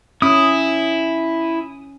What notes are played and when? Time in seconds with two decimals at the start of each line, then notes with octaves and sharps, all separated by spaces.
0.22 C#4 E4 D#6